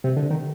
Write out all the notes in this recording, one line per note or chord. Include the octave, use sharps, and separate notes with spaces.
C3
D3
D#3